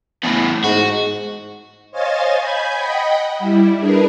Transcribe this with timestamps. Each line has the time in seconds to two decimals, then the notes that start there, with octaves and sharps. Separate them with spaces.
0.24 E2 A2
0.64 G#2 F#4
1.91 C5 C#5 D#5 F5 G#5 A6
2.39 G#5 B5 G6 G#6
2.73 D#5 F#5 G5 B5
3.39 G3 E4
3.78 D4 G#4 A#4 B4